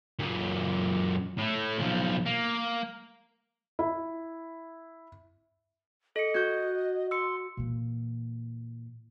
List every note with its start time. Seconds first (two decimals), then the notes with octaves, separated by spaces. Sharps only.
0.20 F#2 A#2
1.38 A2 A3
1.79 B1 F3
2.26 A#3
3.79 E4
6.16 A4 D#5 C#7
6.34 F#4 G6 G#6
7.11 C6 E6 C#7
7.57 A#2 E3